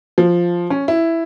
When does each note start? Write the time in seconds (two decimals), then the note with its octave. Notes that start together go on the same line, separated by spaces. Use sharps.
0.18 F3
0.70 C#4
0.88 E4